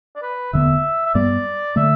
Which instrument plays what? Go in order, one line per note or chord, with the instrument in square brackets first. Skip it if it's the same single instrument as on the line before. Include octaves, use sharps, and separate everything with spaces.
[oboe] D5
B4
[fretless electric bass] E1 D2 D3 B3 [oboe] E5
[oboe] E5
[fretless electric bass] G2 G3 B3 [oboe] D5
[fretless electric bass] D3 A3 [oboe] E5